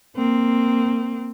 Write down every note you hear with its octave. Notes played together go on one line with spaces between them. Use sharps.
A#3 C4